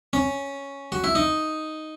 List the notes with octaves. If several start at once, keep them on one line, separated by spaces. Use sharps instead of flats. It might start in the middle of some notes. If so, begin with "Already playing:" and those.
C#4
F#4
E4
D#4